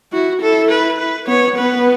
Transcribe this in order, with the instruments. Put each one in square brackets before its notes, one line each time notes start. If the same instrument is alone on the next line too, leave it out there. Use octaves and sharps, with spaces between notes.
[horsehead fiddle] E4 [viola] F#4
[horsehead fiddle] E4 [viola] A4
[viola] B4
B4
[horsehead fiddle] B3 [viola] C#5
[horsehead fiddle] B3 [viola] B4